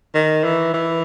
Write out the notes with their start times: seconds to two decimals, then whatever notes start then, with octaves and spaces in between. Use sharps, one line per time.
0.14 D#3
0.44 E3
0.74 E3